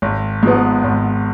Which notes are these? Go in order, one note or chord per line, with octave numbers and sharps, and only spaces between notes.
G#1
G#2 F3 B3
G#1